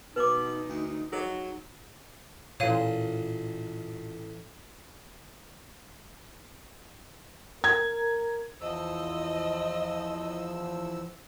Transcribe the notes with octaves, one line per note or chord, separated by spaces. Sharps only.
B2 D#4 B4 D6
D2
F#3 G#4 D#5
A1 A#2 C#5 F5 D#6 D#7
A#4 G#6
E2 F3 D#5 E6